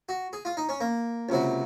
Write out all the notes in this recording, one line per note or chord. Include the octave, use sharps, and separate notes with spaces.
F#4
G#4
F4
D#4
C#4
A#3
C#2 C3 F#3